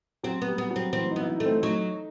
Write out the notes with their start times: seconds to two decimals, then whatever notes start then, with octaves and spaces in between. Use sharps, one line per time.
0.24 F#3 C4
0.42 B3
0.47 G3
0.58 B3
0.71 F#3
0.76 C4
0.93 E3 C4
1.11 D#4
1.16 B3 E4
1.28 D#4
1.40 A3
1.45 C4
1.62 F#3 D#4